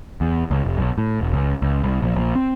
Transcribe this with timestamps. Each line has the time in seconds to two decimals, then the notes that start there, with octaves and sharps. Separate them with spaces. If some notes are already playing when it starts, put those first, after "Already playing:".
0.21 E2
0.51 C#2
0.65 F1
0.78 B1
0.98 A2
1.21 E1
1.33 C#2
1.62 C#2
1.83 C2
2.02 A#1
2.16 A#1
2.35 C4